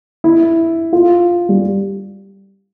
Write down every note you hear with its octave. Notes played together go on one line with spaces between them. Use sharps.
E4
F4
G3